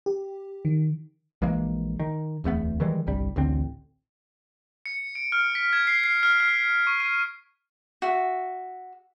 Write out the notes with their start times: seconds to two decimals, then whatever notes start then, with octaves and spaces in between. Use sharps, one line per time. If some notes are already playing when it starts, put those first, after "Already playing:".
0.06 G4
0.65 D#3
1.42 A#1 E3 G#3 A#3
1.99 D#3
2.44 D1 E2 A3 B3
2.80 D#3 E3 G3 G#3
3.07 G1 C2 G3
3.36 A1 D2 D3 C4
4.86 C#7
5.15 D7
5.32 F6
5.55 B6
5.73 G#6
5.87 C7
6.04 C7
6.23 F6
6.40 F6
6.87 C#6
7.00 D#7
8.02 F#4 E5